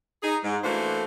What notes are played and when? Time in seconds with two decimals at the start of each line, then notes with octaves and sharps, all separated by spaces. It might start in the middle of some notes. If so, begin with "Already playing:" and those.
0.23 D#4 G#4
0.44 G#2
0.64 E3 A3 A#3 D4 F#4 C5